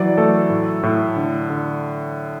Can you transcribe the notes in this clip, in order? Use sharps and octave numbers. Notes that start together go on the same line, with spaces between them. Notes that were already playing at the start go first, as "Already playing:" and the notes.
Already playing: E3 F#3 D5
A3 A4
A2
A2
D3
D3